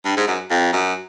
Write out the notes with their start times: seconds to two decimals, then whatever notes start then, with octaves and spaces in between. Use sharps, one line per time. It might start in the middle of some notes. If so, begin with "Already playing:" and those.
0.05 G2
0.17 G#2
0.28 F#2
0.50 F2
0.73 F#2